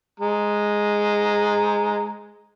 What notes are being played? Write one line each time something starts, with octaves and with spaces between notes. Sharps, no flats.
G#3 A#5